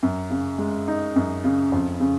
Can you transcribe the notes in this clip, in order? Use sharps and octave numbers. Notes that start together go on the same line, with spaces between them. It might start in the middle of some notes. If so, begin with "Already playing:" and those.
F#2
C#3
G#3
D#4
F#2
C#3
F2
C#3